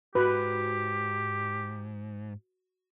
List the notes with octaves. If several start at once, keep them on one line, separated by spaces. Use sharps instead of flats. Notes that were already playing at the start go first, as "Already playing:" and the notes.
G#2 F#4 G4 B4